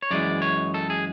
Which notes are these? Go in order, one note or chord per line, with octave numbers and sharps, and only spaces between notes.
C#5
F#2 E3 G#3 D5
C#5
A4
G#4